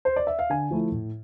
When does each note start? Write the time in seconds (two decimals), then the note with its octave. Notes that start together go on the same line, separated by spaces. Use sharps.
0.05 C5
0.16 D5
0.27 E5
0.39 F5
0.50 D3 G#5
0.71 F3 A3 E4
0.92 A2